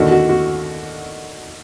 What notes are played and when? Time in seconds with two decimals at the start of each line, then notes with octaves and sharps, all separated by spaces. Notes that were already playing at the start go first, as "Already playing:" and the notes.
Already playing: D#2 D3 F#4
0.11 F#4
0.29 F#4